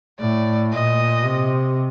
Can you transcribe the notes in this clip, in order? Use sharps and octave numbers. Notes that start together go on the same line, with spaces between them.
A2 D5
A#2 D#5
C3